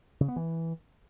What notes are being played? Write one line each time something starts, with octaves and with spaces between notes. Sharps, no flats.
C#3
B3
E3